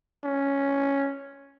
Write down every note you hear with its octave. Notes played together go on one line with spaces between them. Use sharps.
C#4